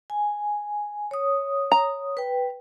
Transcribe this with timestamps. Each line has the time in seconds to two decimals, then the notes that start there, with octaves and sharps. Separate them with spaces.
0.10 G#5
1.11 C#5 D#6
1.72 A#5
2.17 B4 G5